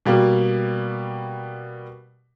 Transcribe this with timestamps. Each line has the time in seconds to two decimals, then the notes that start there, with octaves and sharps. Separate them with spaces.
0.06 B2 G3 A#3